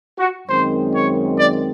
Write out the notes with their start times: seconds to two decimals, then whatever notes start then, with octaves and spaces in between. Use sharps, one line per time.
0.18 F#4
0.47 F#2 D#3 G#3 C4 C5
0.92 C#5
1.37 D5